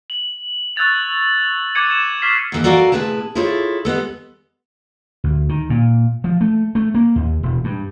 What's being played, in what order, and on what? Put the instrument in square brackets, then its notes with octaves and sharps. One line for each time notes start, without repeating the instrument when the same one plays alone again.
[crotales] F#7
C#6 E6 F#6 G#6 A6 F7
F#7
D6 F#6 G#6 C#7 D#7
E7
C#6 D6 F6 G#6 B6 C7
[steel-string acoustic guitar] D#2 G#2 E3 A4 D#5
F#4 A4 A#4 D5 F5 G#5
A2 C3 G#4 B4 A5
E4 F4 G#4 A4 C5 C#5
G3 G#3 B3 A4
[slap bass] D2
D#3
A#2
F3
A3
A3
A#3
D#2
E1
G2